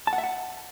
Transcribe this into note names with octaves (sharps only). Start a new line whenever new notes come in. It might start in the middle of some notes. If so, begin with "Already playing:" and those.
A5
F#5
E5
F#5